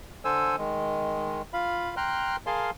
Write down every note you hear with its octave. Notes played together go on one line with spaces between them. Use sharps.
D3 A4 C5 G#5 E6
D#3 G#3
F4 F5 B5
G5 A#5 C6 F6 F#6
G#4 A#4 F5 G#5 A5 C6